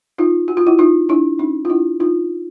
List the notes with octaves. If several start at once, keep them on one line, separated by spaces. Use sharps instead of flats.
D#4 F4
F#4
F4
E4 F#4
D#4 F4
D4 E4
C#4 D#4
F4
D4 E4
D#4 F4